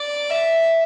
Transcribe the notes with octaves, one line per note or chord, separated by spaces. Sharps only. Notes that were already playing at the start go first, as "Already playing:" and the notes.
Already playing: D5
E5